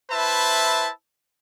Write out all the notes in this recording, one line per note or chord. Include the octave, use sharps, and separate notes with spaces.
E4 B4 C5 E5 A5